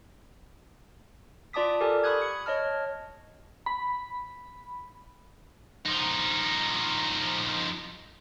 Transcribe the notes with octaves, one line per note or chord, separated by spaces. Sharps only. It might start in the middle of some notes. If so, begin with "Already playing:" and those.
F4 D5 A5 D6 D#6 B6
G4 A4 A#4 D5 G#5
B5 C#6 D#6 F#6 G#6
C#7
C#5 D#5 A5 F6
B5
F3 D#4